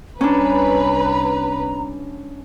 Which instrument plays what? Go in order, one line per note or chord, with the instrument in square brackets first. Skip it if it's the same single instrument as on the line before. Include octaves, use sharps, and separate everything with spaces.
[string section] C2 B4 [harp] C#4 D4 [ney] A#5